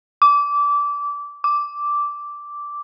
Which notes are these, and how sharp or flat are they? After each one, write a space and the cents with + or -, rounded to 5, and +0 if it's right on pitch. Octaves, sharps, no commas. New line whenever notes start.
D6 -20
D6 -5